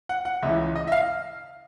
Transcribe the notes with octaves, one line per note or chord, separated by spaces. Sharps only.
F#5
F#5
C#2 C#3 E3 E5
D#5
E5
F5